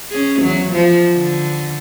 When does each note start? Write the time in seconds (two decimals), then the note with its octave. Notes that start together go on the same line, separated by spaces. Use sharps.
0.11 C#4 G#4
0.41 E2 F#3
0.72 F3
1.15 D3